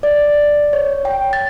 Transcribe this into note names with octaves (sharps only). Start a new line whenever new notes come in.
D5
C#5
G5
A6